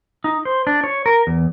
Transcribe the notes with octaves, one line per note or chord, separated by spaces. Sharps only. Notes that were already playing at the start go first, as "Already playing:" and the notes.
D#4
C5
D4
C#5
A#4
E2